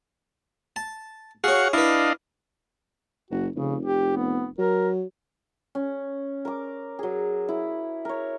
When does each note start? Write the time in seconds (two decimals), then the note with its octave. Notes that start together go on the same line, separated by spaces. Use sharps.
0.76 A5
1.44 F#4 G#4 C#5 F5 F#5
1.73 D4 E4 B4 D#5 F5
3.30 F#1 F#4
3.56 F1 C#3
3.85 G4
4.17 B3
4.58 F#3 A#4
5.75 C#4
6.45 A#4 D6
6.99 F#3 G#4
7.49 E4
8.05 A#4 C#5